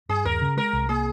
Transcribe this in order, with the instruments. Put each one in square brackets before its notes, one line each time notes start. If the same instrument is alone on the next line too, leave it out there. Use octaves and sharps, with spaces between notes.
[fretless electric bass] G2 [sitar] G#4
[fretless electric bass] D#2 [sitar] A#4
[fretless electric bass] C#3
[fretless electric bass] G#3 [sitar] A#4
[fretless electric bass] C2
[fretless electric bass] A#3 [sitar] G#4